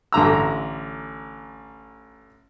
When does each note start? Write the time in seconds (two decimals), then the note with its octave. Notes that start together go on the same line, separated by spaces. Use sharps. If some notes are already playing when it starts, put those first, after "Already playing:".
0.13 A1 D3 A#5 E6